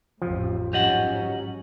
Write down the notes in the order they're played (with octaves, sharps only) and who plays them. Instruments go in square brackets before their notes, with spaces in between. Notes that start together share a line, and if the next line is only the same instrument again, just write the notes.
[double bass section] A1 F2 A2 [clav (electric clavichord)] F3
[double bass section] G#2 F#3 C#4 [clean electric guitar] G4 D#5 F#5